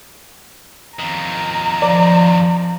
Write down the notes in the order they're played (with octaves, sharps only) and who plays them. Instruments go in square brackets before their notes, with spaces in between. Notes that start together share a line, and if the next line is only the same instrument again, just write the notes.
[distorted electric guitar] F2 D#3 [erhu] A#5
[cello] F3 [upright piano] D5